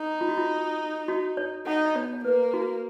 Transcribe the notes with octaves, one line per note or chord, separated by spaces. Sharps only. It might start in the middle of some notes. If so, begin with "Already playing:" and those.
Already playing: D#4
F4
F#4
F4
F#4
C#5
D#4 F#5
D#5
B3 C#5
C#5
A#3 B4
F#4